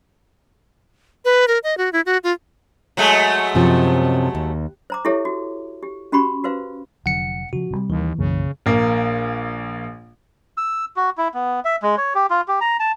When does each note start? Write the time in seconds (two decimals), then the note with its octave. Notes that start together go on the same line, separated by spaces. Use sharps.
1.25 B4
1.48 A#4
1.64 D#5
1.78 F#4
1.93 E4
2.06 F#4
2.24 F4
2.97 F#3 G#3 A3
3.55 F#2 C3 F3
4.35 D#2
4.90 C5 A#5 D6
5.05 E4 G4 A4 C#5 E5
5.25 F#4
5.83 G4
6.12 C#4 F#4 G4 B5 C#6
6.44 F#4 B4 C5 F5
7.06 F1 D3 F#3 F#5 C#7
7.53 C#3 F3 F#4
7.71 C3 D#3 G3
7.90 D#2 E3
8.19 B1 F#2 C#3 A#3
8.66 A#1 A#3
10.57 E6
10.96 F#4
11.18 E4
11.34 B3
11.65 E5
11.82 G#3
11.98 C#5
12.15 G4
12.30 F4
12.48 G4
12.61 A#5
12.80 A5